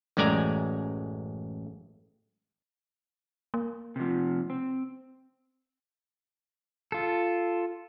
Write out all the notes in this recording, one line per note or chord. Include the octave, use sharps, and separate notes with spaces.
A1 F#2 G#3 D5 G#5 A#5
A#3
C3 F3
C4
F4 A4